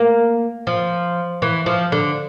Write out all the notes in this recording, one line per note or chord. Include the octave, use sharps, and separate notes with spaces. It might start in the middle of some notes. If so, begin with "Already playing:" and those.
Already playing: A#3
F3
E3
F3
D3